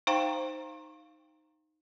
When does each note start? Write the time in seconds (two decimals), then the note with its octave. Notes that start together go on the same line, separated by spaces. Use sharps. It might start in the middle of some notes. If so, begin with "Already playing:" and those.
0.07 D#4 C5 F5 G5 A#5 C#6